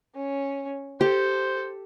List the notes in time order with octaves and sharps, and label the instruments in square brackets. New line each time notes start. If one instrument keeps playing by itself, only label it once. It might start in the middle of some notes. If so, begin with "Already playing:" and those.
[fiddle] C#4
[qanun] G4 [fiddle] A4 [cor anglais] C5